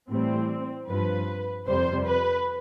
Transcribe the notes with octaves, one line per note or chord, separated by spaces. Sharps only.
A2 E3 G3 C4
G2 F3 B4
F2 C3 G3 C5
B4